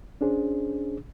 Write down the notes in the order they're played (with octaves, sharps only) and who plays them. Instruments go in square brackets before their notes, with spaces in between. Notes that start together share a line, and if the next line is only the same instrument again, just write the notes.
[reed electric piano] C#4 D4 G#4 C5